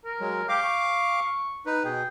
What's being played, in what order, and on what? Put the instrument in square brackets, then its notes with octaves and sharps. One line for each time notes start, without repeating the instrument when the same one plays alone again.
[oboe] A#4
[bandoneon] F#3 G#3
[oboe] G4 [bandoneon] F5 D6
[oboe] C#6
[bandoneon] D#4 B4
[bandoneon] B2 G#4 [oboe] G5